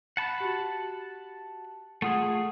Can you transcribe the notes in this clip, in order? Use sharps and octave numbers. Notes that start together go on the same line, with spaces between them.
F#5 A5 B5
F#4 G4
A3 F4 G#4 F#5 D#6